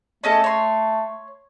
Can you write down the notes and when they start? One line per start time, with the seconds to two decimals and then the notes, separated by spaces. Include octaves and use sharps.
0.24 A3 C#4 D#4 A4
0.44 C#5 C6